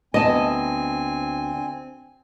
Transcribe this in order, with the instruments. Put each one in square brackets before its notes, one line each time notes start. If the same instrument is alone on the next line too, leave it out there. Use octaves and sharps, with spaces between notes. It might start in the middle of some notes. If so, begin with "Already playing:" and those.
[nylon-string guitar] D2 B3 A5 [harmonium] C4 G#5 [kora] D#5